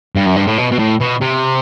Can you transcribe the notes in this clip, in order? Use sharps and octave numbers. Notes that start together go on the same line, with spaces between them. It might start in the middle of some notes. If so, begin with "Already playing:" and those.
G2
F#2
G2
A2
B2
B2
A2
B2
C3